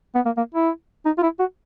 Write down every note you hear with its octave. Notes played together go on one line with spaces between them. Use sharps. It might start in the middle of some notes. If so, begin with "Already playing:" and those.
B3
A#3
A#3
E4
D#4
F4
E4
F#4